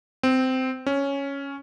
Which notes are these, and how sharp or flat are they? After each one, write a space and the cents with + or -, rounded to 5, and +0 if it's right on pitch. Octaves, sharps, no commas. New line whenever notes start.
C4 -15
C#4 +0